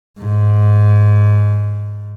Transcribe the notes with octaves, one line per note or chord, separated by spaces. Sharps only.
G#2